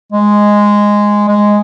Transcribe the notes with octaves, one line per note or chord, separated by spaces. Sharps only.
G#3
G#3